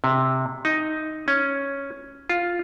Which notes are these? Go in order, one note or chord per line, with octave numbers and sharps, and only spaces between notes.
C3
D#4
C#4
F4